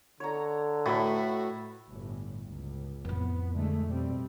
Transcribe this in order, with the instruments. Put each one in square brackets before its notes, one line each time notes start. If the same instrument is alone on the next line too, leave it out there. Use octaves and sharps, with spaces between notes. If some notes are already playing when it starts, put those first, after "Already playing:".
[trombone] D3 [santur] C#5 A#5
[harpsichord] A2 [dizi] F#4 [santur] B4 E5
[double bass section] G1 A2
C#2
[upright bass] F2 A2 [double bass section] B3
[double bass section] D3 G#3 A3
B2 G3 C4